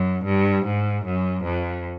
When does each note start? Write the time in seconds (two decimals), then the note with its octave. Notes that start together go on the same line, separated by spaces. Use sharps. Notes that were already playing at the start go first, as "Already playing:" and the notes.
Already playing: F#2
0.25 G2
0.65 G#2
1.05 F#2
1.44 F2